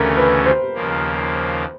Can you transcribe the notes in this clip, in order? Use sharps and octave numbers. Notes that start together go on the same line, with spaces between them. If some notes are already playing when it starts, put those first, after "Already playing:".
Already playing: D2 C#3 E3 A3 C#4 A#4
B4
C5
D#2 C#3 F3 A#3